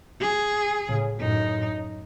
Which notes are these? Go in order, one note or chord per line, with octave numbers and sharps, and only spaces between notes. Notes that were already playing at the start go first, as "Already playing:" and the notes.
G#4
A2 C#3
F#2 A2 D#4